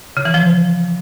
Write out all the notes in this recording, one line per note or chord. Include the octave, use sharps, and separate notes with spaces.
C#3
E3
F3